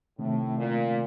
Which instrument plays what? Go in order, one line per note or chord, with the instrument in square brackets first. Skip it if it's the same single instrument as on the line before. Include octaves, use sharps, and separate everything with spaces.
[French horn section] A2 [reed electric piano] C3 D#3 A3 C4
[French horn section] A#2